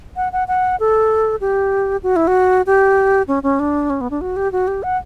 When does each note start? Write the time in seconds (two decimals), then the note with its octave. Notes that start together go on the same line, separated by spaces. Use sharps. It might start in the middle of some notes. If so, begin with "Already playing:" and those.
0.16 F#5
0.33 F#5
0.48 F#5
0.80 A4
1.41 G4
2.03 F#4
2.16 E4
2.27 F#4
2.67 G4
3.28 C#4
3.43 C#4
3.60 D4
3.90 C#4
4.01 B3
4.11 D4
4.21 F#4
4.36 G4
4.52 F#4
4.68 G4
4.83 F#5